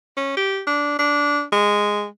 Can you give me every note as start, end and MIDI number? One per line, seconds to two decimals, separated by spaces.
0.16 0.32 61
0.37 0.61 67
0.67 0.96 62
0.99 1.42 62
1.52 2.06 56